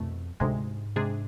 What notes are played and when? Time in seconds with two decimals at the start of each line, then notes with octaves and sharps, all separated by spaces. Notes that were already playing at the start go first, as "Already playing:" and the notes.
Already playing: C2 F2 B2 A3
0.40 D2 G#2 C3 G#3
0.96 C3 G#3 D4 G#4